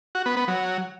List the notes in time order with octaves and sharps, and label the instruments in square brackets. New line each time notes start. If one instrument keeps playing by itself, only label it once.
[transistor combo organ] F#4
B3
B3
F#3